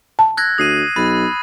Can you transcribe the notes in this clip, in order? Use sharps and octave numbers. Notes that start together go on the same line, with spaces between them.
A5
E6 F#6 G#6 A#6
D2 D#6 C7 D#7
B1 B5 A6